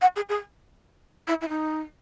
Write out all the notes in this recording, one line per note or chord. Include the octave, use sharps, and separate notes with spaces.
F#5
G#4
G#4
E4
E4
D#4